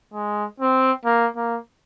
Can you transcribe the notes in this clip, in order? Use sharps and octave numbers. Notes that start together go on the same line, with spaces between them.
G#3
C4
A#3
A#3